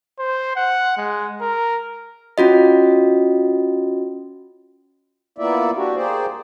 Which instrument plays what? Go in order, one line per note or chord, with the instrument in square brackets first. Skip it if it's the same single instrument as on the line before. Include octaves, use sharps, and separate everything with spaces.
[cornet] C5
F#5
G#3
A#4
[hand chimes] C#4 F4 F#4 D#5
[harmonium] A#3 B3 E4 F4 D5 E5
D4 F#4 G4
A#3 G4 G#4 C5 D5